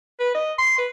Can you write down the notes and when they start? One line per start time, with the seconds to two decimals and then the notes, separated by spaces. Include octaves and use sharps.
0.20 B4
0.34 D#5
0.58 C6
0.78 B4